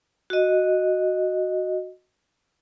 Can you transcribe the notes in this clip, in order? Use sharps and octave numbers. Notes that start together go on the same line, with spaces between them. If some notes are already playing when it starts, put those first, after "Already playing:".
F#4 D#5